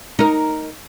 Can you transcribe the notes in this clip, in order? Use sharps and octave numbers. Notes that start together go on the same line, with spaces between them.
D#4 A#4